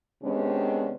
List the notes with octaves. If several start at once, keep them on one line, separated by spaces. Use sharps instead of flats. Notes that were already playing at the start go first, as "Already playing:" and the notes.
C3 D#3 G#3 B3 C#4 D4